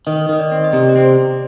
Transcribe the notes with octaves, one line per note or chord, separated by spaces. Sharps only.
D#3 D#5
D#3 D#5
D5
C4
D#5
C3 D5
D5
C4 C5